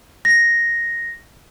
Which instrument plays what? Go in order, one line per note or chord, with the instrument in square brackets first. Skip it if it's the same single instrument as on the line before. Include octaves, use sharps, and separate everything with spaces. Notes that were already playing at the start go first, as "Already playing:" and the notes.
[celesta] A#6